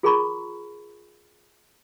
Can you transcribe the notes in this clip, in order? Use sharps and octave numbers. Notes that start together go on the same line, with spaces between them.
F4 G#4 A#4 A#5 B5 C#6